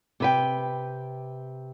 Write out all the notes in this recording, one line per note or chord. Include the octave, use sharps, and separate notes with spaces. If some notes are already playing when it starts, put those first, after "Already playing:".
C3 B4 G5